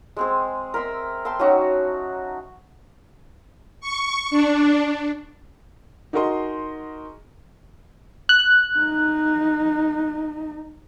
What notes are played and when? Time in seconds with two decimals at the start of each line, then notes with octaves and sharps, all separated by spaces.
0.17 G#3 C4 G#4
0.74 A#4 E5 C6 E6
1.25 E5 G5 A5 C6
1.39 F#3 C#4 D#4 F#4
3.81 C#6
4.30 D4
6.13 D#4 F#4 G#4 A#4 D#5 C6
8.29 F#6
8.79 D#4